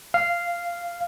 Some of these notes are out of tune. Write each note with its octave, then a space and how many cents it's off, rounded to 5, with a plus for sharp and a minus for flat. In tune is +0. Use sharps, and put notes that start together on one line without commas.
F5 -10